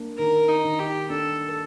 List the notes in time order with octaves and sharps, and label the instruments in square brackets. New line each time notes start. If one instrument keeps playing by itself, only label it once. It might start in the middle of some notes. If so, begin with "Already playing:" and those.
Already playing: [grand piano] A#3 D4
[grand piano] D#3 [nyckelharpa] A#4
[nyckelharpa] D#4
[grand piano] D#3
[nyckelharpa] G4
[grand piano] D4 [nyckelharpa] A4